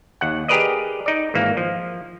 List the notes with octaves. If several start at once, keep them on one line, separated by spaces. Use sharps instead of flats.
D#2 F#5
G4 G#4 A#4 B4 D5 D#5
D#4 D5
G#1 E3 A#3
F3